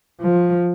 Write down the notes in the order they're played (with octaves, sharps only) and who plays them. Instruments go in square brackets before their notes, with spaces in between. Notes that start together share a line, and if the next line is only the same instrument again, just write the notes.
[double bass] F3